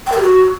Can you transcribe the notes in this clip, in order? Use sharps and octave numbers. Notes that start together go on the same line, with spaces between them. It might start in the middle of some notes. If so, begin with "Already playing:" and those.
G5
A#4
G4
F#4